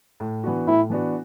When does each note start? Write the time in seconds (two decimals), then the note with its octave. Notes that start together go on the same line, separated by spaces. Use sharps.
0.20 A2
0.43 E3 B3 D4 F#4
0.67 A2 E4
0.90 E3 B3 D4 F#4